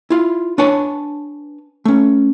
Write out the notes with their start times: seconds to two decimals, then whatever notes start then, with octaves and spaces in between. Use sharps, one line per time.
0.10 E4 F4
0.58 D4 B4 C#5 G#5 A5
1.85 A3 C#4